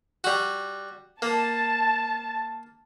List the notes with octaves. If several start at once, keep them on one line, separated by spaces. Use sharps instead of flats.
G3 F#4
A#3 A5